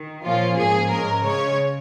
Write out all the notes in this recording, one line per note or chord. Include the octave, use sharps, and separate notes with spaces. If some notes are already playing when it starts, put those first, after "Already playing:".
Already playing: D#3
A#2 F3 A#3 C#4 F4
G#2 F3 A#3 G#4
G#2 G#3 C#4 A#4
C#3 G#3 C#4 C#5